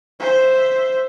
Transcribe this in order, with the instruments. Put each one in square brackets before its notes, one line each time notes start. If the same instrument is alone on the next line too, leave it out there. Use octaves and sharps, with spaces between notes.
[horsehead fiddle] C5 E5